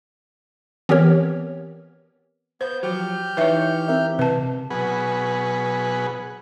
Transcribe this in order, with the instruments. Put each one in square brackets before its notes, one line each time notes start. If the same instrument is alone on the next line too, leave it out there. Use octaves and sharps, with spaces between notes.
[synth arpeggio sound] E3 B3 C4 G4 A#4 C#5
[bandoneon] B3 G6 [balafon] C5
[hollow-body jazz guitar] F3 F#3 [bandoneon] G4 F6 G6
[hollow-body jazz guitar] E3 D#4 C#5 [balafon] B4 E5
[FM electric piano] C4 A#4 E5
[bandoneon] G#2 [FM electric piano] C3 [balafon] B4 A5
[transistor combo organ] B2 F#3 G#4 B4